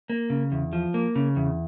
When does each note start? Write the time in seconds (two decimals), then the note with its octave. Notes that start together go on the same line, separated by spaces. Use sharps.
0.10 A#3
0.30 C#3
0.52 E2
0.73 F3
0.94 A#3
1.16 C#3
1.36 E2